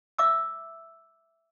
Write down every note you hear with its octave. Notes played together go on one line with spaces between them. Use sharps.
E5 D6 E6